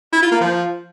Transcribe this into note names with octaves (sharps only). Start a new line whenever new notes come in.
E4
F4
A#3
F3